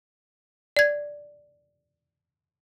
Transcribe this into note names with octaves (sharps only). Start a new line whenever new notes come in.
D5 G#6